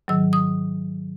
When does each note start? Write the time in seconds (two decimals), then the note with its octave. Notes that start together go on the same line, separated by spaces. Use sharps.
0.08 G#2 D#3 F#3 E6
0.33 D#6